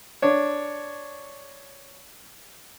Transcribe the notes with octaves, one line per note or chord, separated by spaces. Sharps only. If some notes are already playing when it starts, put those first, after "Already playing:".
D4 C#5